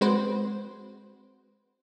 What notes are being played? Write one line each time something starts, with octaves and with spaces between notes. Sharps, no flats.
G#3 C4 F#4 B4 C5